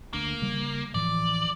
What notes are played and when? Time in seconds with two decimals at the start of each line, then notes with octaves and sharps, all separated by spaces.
0.13 D2 A#3 D4
0.42 C#3 G3
0.94 A2 E3 F3 D5